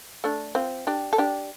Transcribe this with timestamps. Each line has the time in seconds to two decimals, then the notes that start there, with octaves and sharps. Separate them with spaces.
0.24 A3 D4
0.55 C4 F4
0.87 D4 G4
1.13 A4
1.18 D4 G4